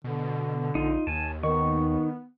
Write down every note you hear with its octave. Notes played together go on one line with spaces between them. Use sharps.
B2 D3
A#1 D#4 F4
D#2 G#5 A5
D#3 B3 C#6